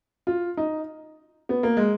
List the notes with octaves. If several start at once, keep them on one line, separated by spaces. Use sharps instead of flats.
F4
D#4
B3
A#3
G#3